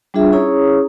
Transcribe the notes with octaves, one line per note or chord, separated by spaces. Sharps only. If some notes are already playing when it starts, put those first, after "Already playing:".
G3 D4 F4 G#4 E5
C#4 E4 G#4 C#5 A#5 D#6